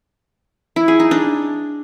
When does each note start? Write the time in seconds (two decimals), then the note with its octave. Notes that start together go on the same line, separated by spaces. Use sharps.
0.76 E4
0.88 G#4
1.00 D#4
1.11 D4